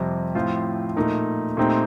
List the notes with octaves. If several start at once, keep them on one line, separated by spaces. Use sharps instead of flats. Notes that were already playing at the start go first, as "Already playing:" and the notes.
Already playing: F2 C3 G3
A2 F3 C4 F4 C5
A#2 A3 D#4 A#4
A#2 A3 C4 D#4 G4